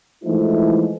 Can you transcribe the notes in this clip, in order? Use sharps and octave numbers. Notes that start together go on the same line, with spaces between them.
E3 F3 G#3 A3 D#4 E4